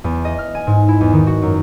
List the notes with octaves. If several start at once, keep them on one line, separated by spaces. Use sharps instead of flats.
E2
D#5
F6
G#5
G#2
E4
E2
D#3
F#4
F#2